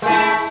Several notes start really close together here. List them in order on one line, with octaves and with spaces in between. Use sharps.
G#3 A3 E4